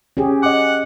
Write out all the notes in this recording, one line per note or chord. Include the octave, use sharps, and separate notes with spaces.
C#4 G4 G#4
D#5 F#5 D6